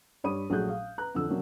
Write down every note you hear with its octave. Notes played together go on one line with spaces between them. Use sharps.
G2 G3 C#5 B5 D#6 D#7
A#1 F#3 A3 G#4 F#6 G6
F5
B4 A#5 F#6
F2 D3 F3 E6
C3 F#3 A#3 C#4 D4